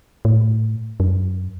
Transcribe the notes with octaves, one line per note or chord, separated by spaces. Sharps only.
A2
F#2